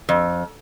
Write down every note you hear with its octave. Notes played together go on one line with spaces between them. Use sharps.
F2